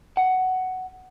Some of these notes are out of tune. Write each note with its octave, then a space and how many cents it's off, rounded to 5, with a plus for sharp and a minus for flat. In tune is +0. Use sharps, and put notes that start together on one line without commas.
F#5 +10